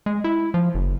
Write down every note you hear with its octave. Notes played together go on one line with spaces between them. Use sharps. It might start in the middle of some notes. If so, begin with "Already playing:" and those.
G#3
E4
F3
F#1